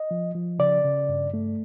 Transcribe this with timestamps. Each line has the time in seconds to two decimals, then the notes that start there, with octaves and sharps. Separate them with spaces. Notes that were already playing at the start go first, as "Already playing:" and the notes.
Already playing: D#5
0.11 F3
0.35 F3
0.59 C#3 D5
0.84 C#3
1.08 G2
1.34 A3